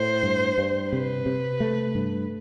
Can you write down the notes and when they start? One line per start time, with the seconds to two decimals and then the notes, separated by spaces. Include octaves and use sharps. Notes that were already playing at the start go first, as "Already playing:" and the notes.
Already playing: A2 C5
0.23 G2
0.58 G2
0.92 C3 B4
1.26 C3
1.60 A3
1.95 G2